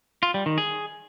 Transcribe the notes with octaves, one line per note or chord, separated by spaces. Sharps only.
F4
G3
D#3
G#4